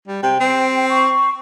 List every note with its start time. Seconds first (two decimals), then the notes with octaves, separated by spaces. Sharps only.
0.08 G3
0.23 C3 G5
0.40 C4
0.90 C#6